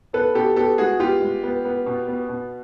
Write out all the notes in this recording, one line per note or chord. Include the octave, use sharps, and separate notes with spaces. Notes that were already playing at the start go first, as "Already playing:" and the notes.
B3 A4 B4
B2 G4 A4
B3 G4 A4
G#3 F#4 G#4
B3 F4 G4
G#3
B3
B3
B2
B3
B2